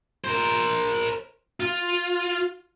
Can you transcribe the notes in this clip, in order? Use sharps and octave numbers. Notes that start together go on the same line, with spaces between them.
A#4 C5
F4